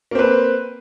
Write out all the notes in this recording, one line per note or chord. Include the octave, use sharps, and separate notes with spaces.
A#3 C4 B4